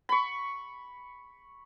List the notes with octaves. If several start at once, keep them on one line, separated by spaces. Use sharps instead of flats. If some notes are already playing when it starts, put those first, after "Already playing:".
B5 C#6